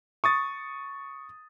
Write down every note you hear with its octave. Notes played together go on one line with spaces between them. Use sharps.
C#6 D#6 A6